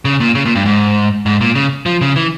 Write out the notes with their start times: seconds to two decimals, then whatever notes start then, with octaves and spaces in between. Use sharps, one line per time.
0.05 C#3
0.20 A#2
0.35 C#3
0.46 A#2
0.55 G2
0.65 G#2
1.26 G#2
1.41 A#2
1.55 C#3
1.86 F3
2.01 C#3
2.16 E3